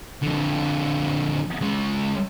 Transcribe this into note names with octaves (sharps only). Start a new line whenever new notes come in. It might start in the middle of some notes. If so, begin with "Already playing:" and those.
F2 D3
C#3 G#3